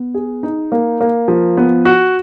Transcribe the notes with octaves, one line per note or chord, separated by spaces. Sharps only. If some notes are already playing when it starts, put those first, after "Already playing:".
Already playing: B3
G#4
D#4
A#3
A#3
F3
B3
F#4